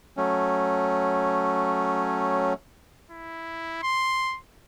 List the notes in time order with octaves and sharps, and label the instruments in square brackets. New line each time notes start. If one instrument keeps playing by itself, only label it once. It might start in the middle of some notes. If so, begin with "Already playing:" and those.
[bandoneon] F#3 A3 C#4
[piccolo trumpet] E4
C6